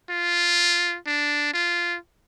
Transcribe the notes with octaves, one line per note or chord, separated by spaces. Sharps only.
F4
D4
F4